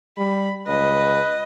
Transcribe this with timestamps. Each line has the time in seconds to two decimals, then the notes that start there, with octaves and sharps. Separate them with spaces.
0.18 G3 B5
0.67 C#2 B4 D#5